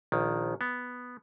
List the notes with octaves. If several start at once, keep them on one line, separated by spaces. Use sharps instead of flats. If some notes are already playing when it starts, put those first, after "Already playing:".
A#1 D#3
B3